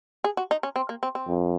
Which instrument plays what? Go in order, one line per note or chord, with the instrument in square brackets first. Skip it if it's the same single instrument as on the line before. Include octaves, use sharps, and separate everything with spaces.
[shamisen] G#4
F#4
D#4
C#4
C4
A#3
C4
C4
[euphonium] F2